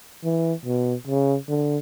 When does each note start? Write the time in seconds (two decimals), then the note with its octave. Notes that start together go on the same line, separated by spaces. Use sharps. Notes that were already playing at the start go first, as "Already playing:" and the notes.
0.24 E3
0.65 B2
1.08 C#3
1.49 D3